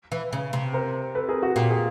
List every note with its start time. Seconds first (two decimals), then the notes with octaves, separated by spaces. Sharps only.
0.12 E3
0.33 C#3
0.53 C3
0.73 A#4 C5
1.14 A4 B4
1.29 G#4 A#4
1.43 F#4
1.56 A#2 G4
1.71 G#4